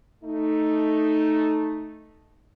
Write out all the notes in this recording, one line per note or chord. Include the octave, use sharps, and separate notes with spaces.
A3 D#4